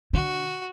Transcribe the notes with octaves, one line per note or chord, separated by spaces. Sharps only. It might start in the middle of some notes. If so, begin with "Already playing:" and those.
D3 F#4